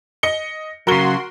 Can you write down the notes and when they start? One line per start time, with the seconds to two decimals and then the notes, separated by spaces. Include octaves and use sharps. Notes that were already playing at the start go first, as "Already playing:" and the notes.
0.23 D#5 C#7 G7
0.87 C#3 F#3 F#4 A#4 C6 G7